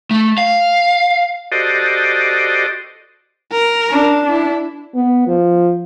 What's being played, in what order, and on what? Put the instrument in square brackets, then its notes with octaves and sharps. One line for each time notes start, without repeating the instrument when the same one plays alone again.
[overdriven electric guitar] A3
F5
[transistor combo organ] F#4 G4 A4 C5 D5 D#5
[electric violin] A#4
[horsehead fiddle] D4
[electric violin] E4
[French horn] B3
F3